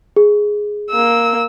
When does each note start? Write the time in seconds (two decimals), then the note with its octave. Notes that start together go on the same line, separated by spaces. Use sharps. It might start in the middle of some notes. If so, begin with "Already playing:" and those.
0.16 G#4
0.91 A#3 E6